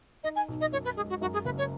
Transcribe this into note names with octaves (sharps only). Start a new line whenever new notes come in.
D#4 D#5
G#5
B1
D#5
F#2 C#5
B4
G#3 G#4
F#4
F#2 F#4
G#4
F#1 B4
C#5